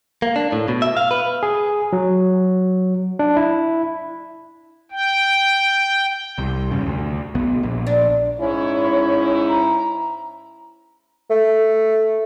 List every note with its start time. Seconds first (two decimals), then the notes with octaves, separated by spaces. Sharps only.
0.22 A#3
0.36 D4
0.52 A2
0.68 B2
0.82 E5
0.97 F5
1.11 B4
1.43 G#4
1.93 F#3
3.19 D4
3.36 E4
4.91 G5
6.38 C2
6.71 E2 G2 C#3
6.86 D2
7.35 B1 B3
7.63 A#1
7.87 D4
8.39 G#2 C#4 E4 C#5
9.48 A#5
11.30 A3